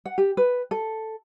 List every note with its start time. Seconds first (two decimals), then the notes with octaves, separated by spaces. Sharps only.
0.06 F#5
0.18 G4
0.37 B4
0.71 A4